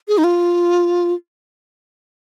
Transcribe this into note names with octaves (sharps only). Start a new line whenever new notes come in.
G#4
D#4
F4